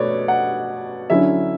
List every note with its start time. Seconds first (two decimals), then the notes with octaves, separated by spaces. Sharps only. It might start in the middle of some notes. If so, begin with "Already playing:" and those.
Already playing: B2 A3 B4 C#5 D5
0.28 F#5
1.10 D3 F#3 C#4 E4 E5